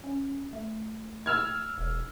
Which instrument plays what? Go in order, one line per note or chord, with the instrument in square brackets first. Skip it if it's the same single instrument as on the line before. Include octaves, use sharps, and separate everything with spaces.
[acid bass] C#4
A3
[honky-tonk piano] E6 F6 G#6
[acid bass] E1